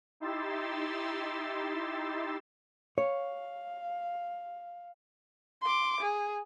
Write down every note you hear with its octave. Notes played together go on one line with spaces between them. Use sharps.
D#4 E4 G4 C6 E6 A6
C#5 F5
C6 D6
G#4